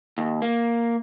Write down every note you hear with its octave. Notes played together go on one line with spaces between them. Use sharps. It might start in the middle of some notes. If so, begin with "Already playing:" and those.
D#2
A#3